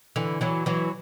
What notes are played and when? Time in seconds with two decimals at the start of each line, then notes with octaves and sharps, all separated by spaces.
0.16 D3 E3
0.41 E3 F#3
0.66 E3 F#3